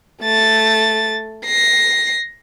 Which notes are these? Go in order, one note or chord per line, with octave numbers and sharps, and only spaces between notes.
A3 A6
A#6 C7